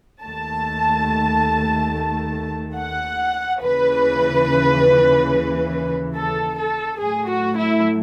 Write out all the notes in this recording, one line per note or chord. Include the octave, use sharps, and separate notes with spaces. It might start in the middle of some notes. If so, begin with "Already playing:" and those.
D#2 D#3 A3 A5
F#5
D#2 C#3 E3 B4
A4
A4
A2 F#3 A3 G#4
F#4
E4